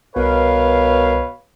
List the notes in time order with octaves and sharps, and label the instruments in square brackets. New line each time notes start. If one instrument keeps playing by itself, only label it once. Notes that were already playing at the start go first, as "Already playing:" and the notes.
[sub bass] C2 [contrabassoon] B2 [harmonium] A#4 [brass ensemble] B4 C#5 F5